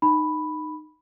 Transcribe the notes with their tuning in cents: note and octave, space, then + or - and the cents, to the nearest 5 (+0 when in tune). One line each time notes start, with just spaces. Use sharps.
D#4 -20 B5 +0